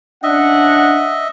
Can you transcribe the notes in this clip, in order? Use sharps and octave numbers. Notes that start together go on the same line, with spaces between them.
C#4 D4 D#5 E5 F#5